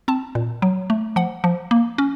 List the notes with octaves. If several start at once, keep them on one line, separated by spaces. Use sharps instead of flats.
C4 A5
A#2
F#3
A3
F3 F#5
F3
A#3
C#4